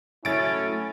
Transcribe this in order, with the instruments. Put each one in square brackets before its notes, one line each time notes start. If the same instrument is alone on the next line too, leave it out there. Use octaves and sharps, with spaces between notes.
[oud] F#3 A3 [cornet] C#4 [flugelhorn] E4 [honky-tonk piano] A6 D7